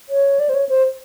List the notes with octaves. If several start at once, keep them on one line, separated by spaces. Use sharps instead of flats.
C#5
D5
C5
C#5
C5